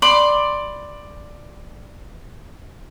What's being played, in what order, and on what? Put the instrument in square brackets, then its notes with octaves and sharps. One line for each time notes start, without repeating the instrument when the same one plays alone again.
[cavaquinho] D5 B5 C6